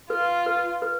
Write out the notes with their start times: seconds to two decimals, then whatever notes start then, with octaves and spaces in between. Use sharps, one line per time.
0.10 F4 B4
0.46 B4
0.82 B4